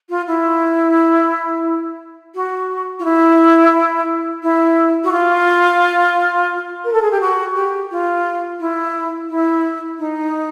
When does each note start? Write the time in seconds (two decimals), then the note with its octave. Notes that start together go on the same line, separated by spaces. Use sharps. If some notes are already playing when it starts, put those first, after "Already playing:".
0.10 F4
0.27 E4
2.35 F#4
2.99 F4
3.04 E4
4.43 E4
5.04 F#4
5.12 F4
6.85 A#4
6.93 A4
7.02 G#4
7.11 G4
7.21 F#4
7.55 G4
7.91 F4
8.60 E4
9.30 E4
9.99 D#4